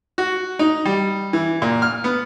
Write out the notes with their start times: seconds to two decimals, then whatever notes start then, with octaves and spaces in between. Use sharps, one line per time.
0.18 F#4
0.59 D#4
0.86 G3
1.33 E3
1.62 A#2
1.82 F6
2.04 B3